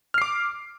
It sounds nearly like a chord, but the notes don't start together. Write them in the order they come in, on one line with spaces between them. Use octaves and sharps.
F6 C7 D6